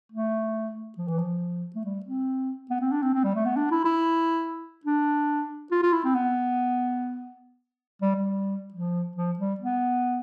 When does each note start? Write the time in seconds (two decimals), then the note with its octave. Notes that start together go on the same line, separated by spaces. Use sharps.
0.12 A3
0.98 F3
1.08 E3
1.18 F3
1.75 A3
1.85 G3
2.06 C4
2.70 B3
2.81 C4
2.91 D4
3.02 C4
3.14 C4
3.24 G3
3.35 A3
3.45 B3
3.56 D4
3.71 E4
3.85 E4
4.86 D4
5.72 F4
5.83 F4
5.93 E4
6.04 C4
6.15 B3
8.02 G3
8.16 G3
8.74 F3
9.16 F3
9.39 G3
9.60 B3